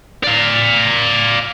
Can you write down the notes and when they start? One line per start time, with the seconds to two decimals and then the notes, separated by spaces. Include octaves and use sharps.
0.24 D5 F5